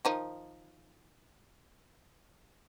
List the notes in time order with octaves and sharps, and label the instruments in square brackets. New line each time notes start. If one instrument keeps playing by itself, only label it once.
[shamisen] D#3 F3 D#4